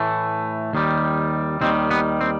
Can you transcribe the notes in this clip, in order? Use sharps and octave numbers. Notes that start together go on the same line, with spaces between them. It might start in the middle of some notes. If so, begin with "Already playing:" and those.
Already playing: A2 E3 A3
D#2 D#3 G3
D#2 D#3 G3 C4
B3
C4